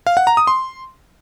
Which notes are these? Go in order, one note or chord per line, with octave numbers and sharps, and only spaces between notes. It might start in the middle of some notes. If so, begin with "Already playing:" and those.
F5
F#5
A#5
D#6
C6